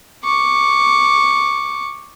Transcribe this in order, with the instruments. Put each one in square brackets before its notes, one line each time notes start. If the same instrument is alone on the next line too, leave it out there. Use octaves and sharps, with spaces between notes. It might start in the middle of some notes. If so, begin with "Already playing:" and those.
[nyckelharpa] C#6 D6